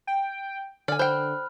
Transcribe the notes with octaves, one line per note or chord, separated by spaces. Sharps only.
G5
D3 D5 G#5 F6
C5 G5 B5 F#6